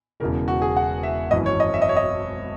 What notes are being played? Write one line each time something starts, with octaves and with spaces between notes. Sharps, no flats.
E1 E2 C#3 E3 A#4
F#4
G#4
F#5
E5
G#1 F#2 E3 D#5
C#5
D#5
E5
D#5
C#5
D#5